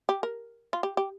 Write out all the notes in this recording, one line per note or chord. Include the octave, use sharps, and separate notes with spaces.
G4
A#4
F4
G4
G4